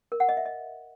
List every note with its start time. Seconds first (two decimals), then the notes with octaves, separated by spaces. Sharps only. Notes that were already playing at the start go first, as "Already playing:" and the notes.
0.12 A#4
0.20 F#5
0.29 D#5
0.37 E5
0.45 D#5